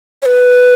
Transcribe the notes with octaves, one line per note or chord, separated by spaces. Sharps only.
C#5
B4